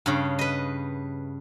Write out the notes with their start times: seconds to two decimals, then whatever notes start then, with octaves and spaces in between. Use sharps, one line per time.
0.06 G2 C#3
0.39 B4 D#5